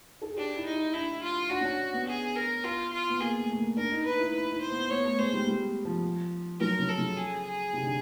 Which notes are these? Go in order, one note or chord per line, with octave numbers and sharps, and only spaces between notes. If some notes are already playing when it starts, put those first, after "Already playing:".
A4
G#4
D4 G4
E4
D#4
E4
D4 E4
F4
D4 F#4
C#4
D4
B3
G#4
A#4
F4
F4
B3
A#3 G#4
A3
A3
A#3
D4 A#4
D#4
D#4 B4
E4
B4
E4
C5
B3
B3 C#5
A3
G#3 C5
G3
G3
F3
F#3 A#4
C#3
A4
C#3
G#4
G#4
C3
D3